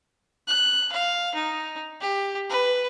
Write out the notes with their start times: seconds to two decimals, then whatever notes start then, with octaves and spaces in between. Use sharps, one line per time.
0.48 F#6
0.92 F5
1.35 D#4
2.01 G4
2.50 B4